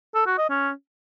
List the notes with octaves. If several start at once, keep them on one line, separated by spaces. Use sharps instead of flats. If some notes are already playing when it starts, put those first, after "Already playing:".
A4
F#4
D#5
C#4